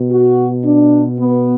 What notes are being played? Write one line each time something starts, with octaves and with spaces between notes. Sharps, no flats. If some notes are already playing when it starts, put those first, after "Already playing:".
Already playing: B2
F#4
D4
B3